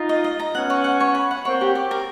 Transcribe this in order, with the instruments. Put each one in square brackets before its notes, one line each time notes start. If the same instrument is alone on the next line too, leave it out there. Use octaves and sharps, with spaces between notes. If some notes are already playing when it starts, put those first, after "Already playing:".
Already playing: [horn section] D#4 F4
[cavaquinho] D#5
D#5
A#5
[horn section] B3 C#4 [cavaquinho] F#5
[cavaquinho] C#5
F#5
C#5
B5
F#5
[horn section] A#3 C4 [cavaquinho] C#5
[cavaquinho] G4
G4
A#4